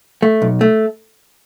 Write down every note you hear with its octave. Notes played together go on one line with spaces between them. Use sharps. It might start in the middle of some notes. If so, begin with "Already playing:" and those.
A3
B1
A3